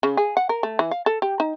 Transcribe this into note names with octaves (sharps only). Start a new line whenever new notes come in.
C#3
G#4
F#5
A#4
A3
E3
F5
A4
G4
D#4